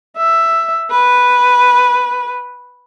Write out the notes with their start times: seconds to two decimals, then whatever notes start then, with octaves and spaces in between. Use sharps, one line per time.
0.17 E5
0.91 B4